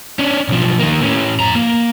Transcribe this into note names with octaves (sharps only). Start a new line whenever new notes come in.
C#4 D4
B1 F3
D#3 A#3
A2 C#4
F2 A#5
A#3